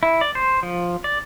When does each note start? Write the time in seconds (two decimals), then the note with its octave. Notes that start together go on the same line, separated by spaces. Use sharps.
0.03 E4
0.21 D5
0.35 C5
0.63 F3
1.04 D5